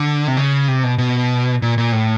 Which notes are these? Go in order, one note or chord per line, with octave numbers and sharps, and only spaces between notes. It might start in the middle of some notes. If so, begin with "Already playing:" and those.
Already playing: D3
C3
C#3
C3
B2
B2
A#2
A#2
A2